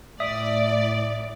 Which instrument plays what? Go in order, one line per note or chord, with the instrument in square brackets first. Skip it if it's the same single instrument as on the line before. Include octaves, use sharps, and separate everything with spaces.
[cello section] A2 [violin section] D5 [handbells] E5 D#6